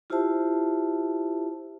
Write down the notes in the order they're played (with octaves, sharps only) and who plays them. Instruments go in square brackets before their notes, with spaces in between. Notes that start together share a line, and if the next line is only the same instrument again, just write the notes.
[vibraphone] E4 F4 G4 C5 E5 A5